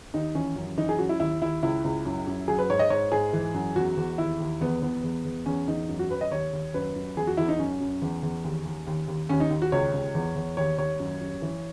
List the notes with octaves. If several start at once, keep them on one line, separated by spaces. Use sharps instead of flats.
D#2 D#4
E3 C#4
F#2
E3 D#4
G#4
F#2 F#4
E4
D#2 E4
D#2 E4
C#2 E4
C#2
F#2
F#2
F#3 G#4
B4
G#2 C#5
D#5
G#2 C#5
G#2 G#4
E3
F#2
E2 F#4
E2
D#2 E4
D#2
E2 B3
E2 B3
E2
E2
E2 C#4
E2 D#4
F#2
F#4
F#2 B4
D#5
D#2 C#5
D#2
F#2 B4
F#2
E2 G#4
F#4
E2 E4
D#4
F#2 C#4
F#2
E2
E2
D#2
D#2
D#2
D#2
D#2 C#4
D#4
D#2
F#4
C#2 C#5
C#2
E2
E2
D#2 C#5
D#2 C#5
F#2
F#2
E3